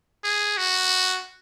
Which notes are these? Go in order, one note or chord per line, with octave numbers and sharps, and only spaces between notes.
G#4
F#4